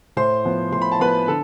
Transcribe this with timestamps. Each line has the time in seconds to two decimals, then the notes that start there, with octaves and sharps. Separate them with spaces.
0.17 A2 C5 C6
0.45 F3 B3
0.72 A2 C6
0.82 B5
0.92 A5
1.00 F3 B3 B4 B5
1.27 D3 A4